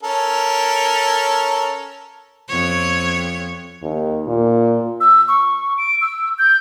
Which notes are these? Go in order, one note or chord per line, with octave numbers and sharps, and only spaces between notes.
C#4 A4 A#4
F2 C#5
D#2
A#2
E6
C#6
D7
E6
G6